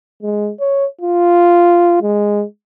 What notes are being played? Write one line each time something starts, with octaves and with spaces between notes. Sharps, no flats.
G#3
C#5
F4
G#3